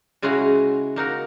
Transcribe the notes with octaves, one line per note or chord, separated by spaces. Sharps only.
C#3 G#3 C#4 E4 F#4 A#5
A#3 D#4 F#4 A#4